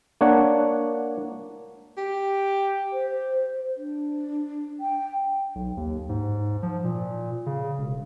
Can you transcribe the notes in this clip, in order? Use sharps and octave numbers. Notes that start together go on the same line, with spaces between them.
A#3 D4 C#5 D5 F#5
G4
C5
D4
G5
B1
D#2
G#2
F3
A#2
C#3
E1